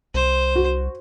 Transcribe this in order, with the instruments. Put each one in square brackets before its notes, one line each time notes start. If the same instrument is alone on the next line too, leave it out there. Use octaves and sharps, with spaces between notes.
[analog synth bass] C2 [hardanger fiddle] C5
[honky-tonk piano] F#4